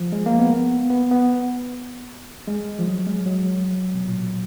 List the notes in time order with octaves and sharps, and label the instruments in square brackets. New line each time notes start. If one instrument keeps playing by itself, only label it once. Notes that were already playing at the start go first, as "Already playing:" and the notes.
Already playing: [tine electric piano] F3
G#3
A#3
B3
B3
B3
G#3
F3
F#3
G#3
F#3
B2
A#2